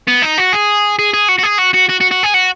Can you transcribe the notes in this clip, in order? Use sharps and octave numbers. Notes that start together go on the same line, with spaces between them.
B3
D#4
F#4
G#4
G#4
G#4
F#4
F#4
G#4
F#4
F#4
F#4
F#4
F#4
G#4
F#4